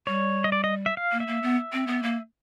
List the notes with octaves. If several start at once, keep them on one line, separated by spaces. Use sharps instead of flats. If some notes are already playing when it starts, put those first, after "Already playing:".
G3 C#5
D#5
D5
D#5
E5
F5
A#3
E5
A#3
B3
C4
B3
A#3